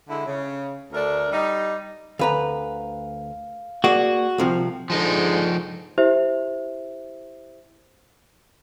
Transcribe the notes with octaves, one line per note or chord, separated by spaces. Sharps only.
D3 G#3 E4
C#3
D2 A3 D4 A#4
G3 D#4
D2 B4 F5 A#5
A#3 F#4 G#4 D5
C2 C3 F3
G#2 D3 F3 G#3 D#4
E4 G4 C5 E5